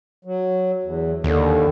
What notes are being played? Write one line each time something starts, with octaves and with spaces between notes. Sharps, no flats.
F#3
E2
D#2 D3